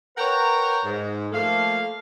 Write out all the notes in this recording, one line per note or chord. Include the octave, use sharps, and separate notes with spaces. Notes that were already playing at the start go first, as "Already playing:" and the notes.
A#4 B4 C#5 F#5 G5 A#5
G#2
F3 A3 A#3 A4 F5